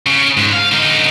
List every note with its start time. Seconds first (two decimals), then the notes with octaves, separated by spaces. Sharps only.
0.06 C#3
0.37 G#2
0.52 F5
0.72 D3 D#4